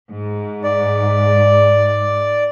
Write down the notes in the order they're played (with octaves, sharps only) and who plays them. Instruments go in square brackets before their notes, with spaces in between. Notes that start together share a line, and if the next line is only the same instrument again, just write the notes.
[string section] G#2
[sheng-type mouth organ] D5